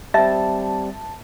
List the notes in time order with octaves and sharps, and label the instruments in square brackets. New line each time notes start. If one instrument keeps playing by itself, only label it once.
[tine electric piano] G3 C4 [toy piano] E5 [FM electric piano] A5